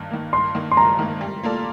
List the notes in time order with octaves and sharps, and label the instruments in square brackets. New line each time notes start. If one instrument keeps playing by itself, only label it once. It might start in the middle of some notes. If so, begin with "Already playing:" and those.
Already playing: [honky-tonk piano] G2 D#3 A#3
D#3 A#3
[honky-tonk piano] G2 [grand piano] C6
[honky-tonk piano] D#3 A#3
[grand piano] C6
[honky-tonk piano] G2 [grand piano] A#5
[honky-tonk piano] D#3 A#3
G3
A#3 F4 A4 D5